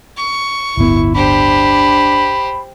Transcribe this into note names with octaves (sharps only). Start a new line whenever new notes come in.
C#6
D1 G1 B3 E4
D4 G4 C5 B5